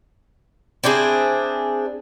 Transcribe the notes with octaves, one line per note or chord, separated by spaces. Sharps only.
C4 D4 E4 G#4